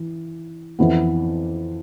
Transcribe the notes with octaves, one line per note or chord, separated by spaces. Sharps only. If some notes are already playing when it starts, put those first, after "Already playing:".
Already playing: E3
F2 E3 B3